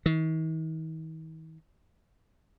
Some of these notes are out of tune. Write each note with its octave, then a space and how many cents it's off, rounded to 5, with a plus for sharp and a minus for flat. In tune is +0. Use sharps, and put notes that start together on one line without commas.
D#3 +45